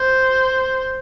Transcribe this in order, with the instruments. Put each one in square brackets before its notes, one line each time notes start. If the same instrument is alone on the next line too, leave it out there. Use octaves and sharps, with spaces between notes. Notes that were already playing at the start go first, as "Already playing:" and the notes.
Already playing: [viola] C5